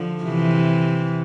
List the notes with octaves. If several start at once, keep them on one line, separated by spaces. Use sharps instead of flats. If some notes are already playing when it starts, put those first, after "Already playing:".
Already playing: D3 F3
C3 E3